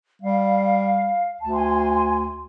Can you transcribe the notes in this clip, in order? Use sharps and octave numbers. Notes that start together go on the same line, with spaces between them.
G3 F5
D2 A5
G#5 C6